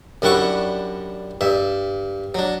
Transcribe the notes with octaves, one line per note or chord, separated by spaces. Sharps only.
F#2 G3 D4 E4 F#5 C#6
G2 E5
F#3 D4